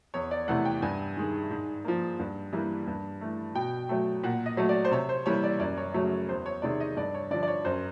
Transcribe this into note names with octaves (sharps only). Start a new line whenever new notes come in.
E2 C#5
D5
C3 E3 A3 F#5
G5
G2 G#5
D#3 G#3
G#2
F3 A#3
G2
E3 G3 A#3
G2
E3 A3
B2 G5
F#3 A3
A#2 F#5
D#5
F#3 A3
D5
C5
C3 C#5
C5
E3 G3 A#3 C#5
D5
F#2 D5
C#5
C#3 F#3 A3 C#5
E2 C5
C#5
C3 D#3 G#3 D5
D#5
G2 D5
C#5
D3 F3 D5
D5
C#5
F#2 C5